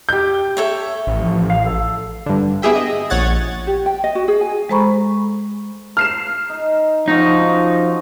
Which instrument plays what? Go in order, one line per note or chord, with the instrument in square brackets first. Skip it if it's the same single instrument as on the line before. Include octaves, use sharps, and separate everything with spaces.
[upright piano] G4 G6
[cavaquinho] A4 C#5 E5
[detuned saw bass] A1
[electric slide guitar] F3
F5
A4
[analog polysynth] G2 D3
B3 E4 G4 G#4 E5 G5
D#5
A#1 A#2 C#5 F#5 G#6 A6
[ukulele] G4
G5
D#5
F#4
G#4
G#5
[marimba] G#3 A4 C5 A#5 B5 C#6
[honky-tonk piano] F6 C7 E7
[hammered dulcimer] D#4
[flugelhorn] F3 [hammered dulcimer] F#3 C#4 F#4 [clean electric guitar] D#4